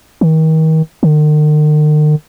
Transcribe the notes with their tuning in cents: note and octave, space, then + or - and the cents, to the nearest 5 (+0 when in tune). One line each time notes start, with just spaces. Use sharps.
D#3 +35
D#3 -45